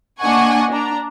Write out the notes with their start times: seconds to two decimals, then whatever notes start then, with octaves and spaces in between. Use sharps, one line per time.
0.21 A#3 D4 D#5 F#5 G#5 C#6
0.70 D4 A#5